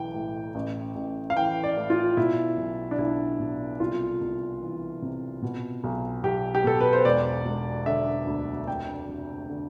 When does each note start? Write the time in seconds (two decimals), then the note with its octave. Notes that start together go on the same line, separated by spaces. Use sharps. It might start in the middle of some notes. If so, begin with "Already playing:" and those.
Already playing: B1 E3 G5
0.14 A2
0.55 A1
0.95 A1
1.30 F5
1.36 E3 G5
1.64 D5
1.77 A2
1.90 F4
2.17 B2 E4
2.57 B1
2.91 D4
2.98 B1 E4
3.40 B2
3.80 C2 F4
4.21 C2
4.61 E3
5.02 C3
5.42 B2
5.84 B1
6.23 B1 G4
6.55 G4
6.64 B2 A4
6.80 B4
6.93 C5
7.05 E1 D5
7.45 E1
7.86 D3 E5
8.27 D2
8.67 F1 G5
9.08 F1
9.49 D3